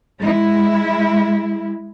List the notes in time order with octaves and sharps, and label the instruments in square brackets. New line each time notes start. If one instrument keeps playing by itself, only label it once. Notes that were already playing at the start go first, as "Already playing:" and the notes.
[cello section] G#3 E4